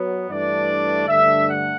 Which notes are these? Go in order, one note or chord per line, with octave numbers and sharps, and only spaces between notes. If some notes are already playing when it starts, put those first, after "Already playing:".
Already playing: F#3 B3
G2 E3 A3 D4 D5
G2 D3 A3 D4 E5
F#5